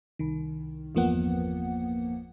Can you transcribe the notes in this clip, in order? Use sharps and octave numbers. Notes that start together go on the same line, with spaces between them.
C2 D#3
G1 E2 F3 A#3 B3 F#5